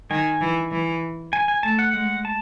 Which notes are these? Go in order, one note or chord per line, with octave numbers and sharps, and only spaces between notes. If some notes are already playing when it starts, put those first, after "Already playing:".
D#3 G#5
E3
E3
G#5
G#5
A3 A5
F#5
G#3 F#5
A5